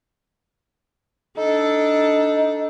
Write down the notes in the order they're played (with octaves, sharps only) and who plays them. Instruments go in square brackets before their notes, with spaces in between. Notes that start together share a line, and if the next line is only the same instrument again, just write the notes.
[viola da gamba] D4 A4 [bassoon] D#4